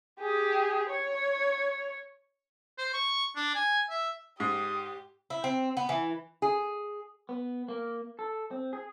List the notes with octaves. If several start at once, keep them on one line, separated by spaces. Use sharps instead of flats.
G4 G#4
C#5
C5
C#6
D4
G#5
E5
G#2 G4 D#6
E4
C4
B3
E3
G#4
B3
A#3
A4
C4
G#4